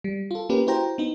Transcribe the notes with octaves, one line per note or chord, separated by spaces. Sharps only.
G3
F4 A4
A#3 C#4 G4 A#4 B4
E4 F#4 C5 G5 A#5
B3 D#4